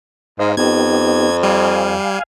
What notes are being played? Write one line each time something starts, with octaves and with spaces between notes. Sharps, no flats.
G#2 C5 D#5 F5
F2 B3 D#4 G4 G#6
G3 F5 G#5